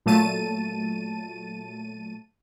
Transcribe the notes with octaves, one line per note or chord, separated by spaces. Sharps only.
A#2 F#3 A3 A5 D#7